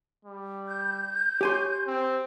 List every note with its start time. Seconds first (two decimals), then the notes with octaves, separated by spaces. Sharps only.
0.25 G3
0.66 G6
1.41 G4 C#5 G#5 C6
1.87 C4